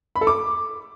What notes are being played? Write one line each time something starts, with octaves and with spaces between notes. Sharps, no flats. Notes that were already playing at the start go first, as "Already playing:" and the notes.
B5
A4
D6